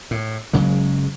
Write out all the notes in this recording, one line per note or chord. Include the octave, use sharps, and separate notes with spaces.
A2
F#1 C#3 F#3 G#3